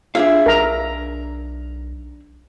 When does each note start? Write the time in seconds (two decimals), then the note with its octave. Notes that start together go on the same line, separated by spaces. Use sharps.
0.15 D4 F4 G#4 E5 F5
0.46 B1 A#4 A#5